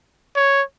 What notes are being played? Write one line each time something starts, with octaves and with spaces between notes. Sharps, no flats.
C#5